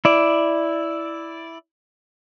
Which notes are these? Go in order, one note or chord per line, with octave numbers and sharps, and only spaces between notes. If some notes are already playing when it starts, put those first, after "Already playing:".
E4 D5